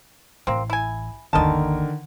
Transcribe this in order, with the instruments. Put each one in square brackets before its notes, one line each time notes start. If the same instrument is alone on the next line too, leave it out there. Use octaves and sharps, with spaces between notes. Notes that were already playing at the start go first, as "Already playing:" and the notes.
[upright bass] A1 [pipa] A#3 C4
[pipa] E4 G#5
[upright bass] G1 D#2 [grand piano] D3 D#3 A#4 [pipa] D#5 A5